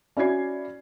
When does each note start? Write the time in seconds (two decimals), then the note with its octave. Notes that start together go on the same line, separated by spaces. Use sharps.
0.17 C#4 E4 F#4 D5 G#6 C7